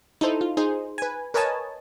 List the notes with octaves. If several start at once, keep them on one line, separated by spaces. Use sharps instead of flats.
D#4 E4 A4 C5
F4
D#4 G#4 C5
B4 G#5
A#4 B4 C#5 D#5 G#5 A5